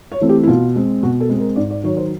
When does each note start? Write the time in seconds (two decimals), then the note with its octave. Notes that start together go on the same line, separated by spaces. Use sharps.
0.12 C#5
0.21 E3 A3 C4
0.29 G4
0.43 E4
0.47 B2 F4
0.76 G#3 C4
1.03 B2 F#4
1.20 A4
1.29 G#3 C4
1.38 A#4
1.56 G#2 D5
1.71 D5
1.84 D#3 F#3 C#5
1.97 C5